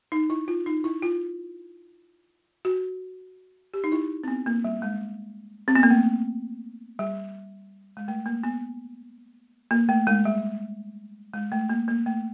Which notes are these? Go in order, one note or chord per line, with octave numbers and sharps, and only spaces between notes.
D#4
E4
F4
D#4
E4
F4
F#4
G4
D#4
E4
C4
B3
A#3
G3
G#3
C4
B3
A#3
A3
G3
G#3
A3
A#3
B3
A#3
A3
G#3
G3
G#3
A3
A#3
A#3
A3